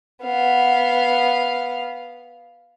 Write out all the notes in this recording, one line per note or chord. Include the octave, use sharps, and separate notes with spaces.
B3 F5